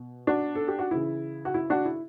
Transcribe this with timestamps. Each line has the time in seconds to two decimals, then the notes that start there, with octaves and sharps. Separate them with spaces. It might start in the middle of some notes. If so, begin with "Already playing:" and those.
Already playing: B2
0.27 D4 F#4
0.55 A4
0.68 G4
0.79 F#4
0.91 C#3 E3 E4
1.45 F#4
1.54 E4
1.70 D4 F#4
1.85 E4